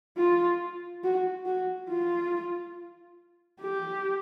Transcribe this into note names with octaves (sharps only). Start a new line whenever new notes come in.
F4
F#4
F#4
F4
G4